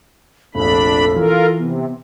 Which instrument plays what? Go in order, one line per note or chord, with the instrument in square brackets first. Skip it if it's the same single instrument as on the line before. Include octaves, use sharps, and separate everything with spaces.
[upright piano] F1 A#1 [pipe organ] D4 B5 [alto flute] A4
[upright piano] E3 [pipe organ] F4 A#4
[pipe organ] C3 [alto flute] B3